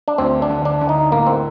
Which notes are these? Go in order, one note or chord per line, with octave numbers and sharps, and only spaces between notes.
D4
D2 C4
D4
D3
D4
D3
D#4
A2 A#3
C4